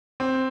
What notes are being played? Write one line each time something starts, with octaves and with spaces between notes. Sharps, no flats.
C4